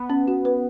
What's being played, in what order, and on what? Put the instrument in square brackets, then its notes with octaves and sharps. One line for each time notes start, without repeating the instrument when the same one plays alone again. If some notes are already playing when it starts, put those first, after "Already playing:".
Already playing: [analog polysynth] B3
[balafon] C#4
F#4
B4